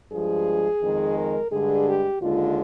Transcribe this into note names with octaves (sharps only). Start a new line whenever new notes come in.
G2 F3 G#3 G#4
F2 D#3 G#3
A#4
G2 D3 G#3 G#4
G4
D#2 D3 G#3 F4